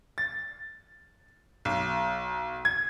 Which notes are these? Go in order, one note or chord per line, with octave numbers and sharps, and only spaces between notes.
A6
B1
G#6